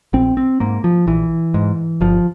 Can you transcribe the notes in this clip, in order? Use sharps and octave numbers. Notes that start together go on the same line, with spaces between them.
A#1 C4
C4
G#2 A#3
F3
A#1 E3
G#2
G1 F3